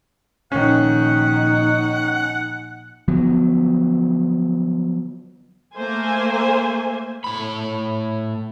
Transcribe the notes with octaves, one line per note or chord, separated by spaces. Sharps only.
A#1 D#3 C#4 D#4 F#5
D3 F3 F#3 B3
A3 A#3 C5 G#5
A2 B5